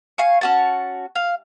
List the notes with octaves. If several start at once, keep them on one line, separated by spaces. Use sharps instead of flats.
F5 G#5 C#6
C#4 F#4 A5
F5